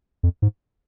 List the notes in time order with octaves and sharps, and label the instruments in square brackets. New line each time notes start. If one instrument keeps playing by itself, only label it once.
[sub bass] F2
G#2